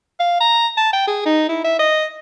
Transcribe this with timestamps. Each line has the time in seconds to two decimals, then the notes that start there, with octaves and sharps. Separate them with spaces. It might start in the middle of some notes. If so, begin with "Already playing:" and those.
0.20 F5
0.40 A#5
0.77 A5
0.93 G5
1.07 G#4
1.26 D#4
1.49 E4
1.64 E5
1.79 D#5